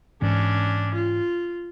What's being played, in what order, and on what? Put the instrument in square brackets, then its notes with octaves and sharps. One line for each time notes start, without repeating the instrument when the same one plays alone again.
[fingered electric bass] G#2 E3 [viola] C#4 D4
[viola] F4